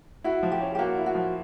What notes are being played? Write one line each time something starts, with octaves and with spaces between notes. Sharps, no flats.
E4 F#4
F3
G4
C#4
G4
A#3 F#4
E4
F#4
F3